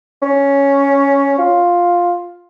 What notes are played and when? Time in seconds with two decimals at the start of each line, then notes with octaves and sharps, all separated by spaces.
0.22 C#4
1.38 F4